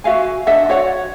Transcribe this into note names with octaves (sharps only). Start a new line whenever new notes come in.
F#4 E5 F5 G#5
D4 D#5 E5 F#5
F#4 C#5 D5 F#5